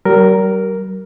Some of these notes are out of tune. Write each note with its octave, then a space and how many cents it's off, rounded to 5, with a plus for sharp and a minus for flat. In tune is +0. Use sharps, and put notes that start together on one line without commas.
G3 -45 A#4 +0